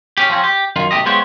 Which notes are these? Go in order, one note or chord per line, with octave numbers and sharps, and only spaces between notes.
C#4 G4
F3 C4 C#4
G4
F#2 D#3 F4
B1 A3 G4 D#5
G#3 B3 F4 G4 C5 C#5